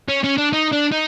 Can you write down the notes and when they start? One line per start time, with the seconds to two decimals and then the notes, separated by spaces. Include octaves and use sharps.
0.09 C#4
0.24 C#4
0.37 D4
0.53 D#4
0.72 D4
0.92 D#4